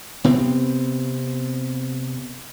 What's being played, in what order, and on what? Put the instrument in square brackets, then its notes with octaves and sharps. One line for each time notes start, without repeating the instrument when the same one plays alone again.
[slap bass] C3 B3 C4